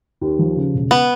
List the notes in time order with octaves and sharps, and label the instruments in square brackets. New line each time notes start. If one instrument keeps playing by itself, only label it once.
[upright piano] D#2
F3
C#3
E1
[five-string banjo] B3